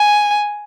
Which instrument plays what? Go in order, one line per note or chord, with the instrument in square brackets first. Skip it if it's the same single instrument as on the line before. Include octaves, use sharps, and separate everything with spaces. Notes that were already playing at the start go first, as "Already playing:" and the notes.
Already playing: [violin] G#5